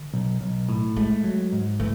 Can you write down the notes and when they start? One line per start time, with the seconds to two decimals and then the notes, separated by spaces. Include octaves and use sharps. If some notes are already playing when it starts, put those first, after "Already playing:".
Already playing: D3
0.14 B1
0.41 B1
0.69 A2
0.96 G#3 A3
1.24 F#3
1.53 G#2
1.80 E3 A3